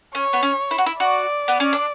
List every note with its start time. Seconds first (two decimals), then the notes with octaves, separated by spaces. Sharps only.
0.15 C#4 C#5
0.33 B3
0.43 C#4
0.71 E4
0.78 F#4
0.86 E4
0.99 F#4 D5
1.48 B3
1.60 C#4
1.73 D4